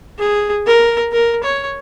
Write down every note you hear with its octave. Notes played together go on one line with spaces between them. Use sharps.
G#4
A#4
A#4
C#5